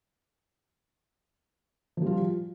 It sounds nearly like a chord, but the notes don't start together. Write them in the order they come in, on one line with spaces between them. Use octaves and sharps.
F3 G3 F4